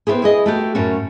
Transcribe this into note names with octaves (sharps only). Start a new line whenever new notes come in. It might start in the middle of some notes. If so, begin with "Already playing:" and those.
B3 C4 D4 E4 G4 G#4
E4 G#4 D#5
A3 F#4 G4
F#2 A2 C#4 F#4